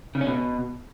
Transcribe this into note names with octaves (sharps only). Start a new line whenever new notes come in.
C#3
C#4
B2